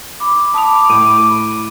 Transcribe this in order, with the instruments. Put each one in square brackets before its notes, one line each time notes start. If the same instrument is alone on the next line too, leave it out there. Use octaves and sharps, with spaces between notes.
[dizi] B5 [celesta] D6
[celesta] A5 D#6 F7 [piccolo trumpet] D6
[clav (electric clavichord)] A2 [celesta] D#7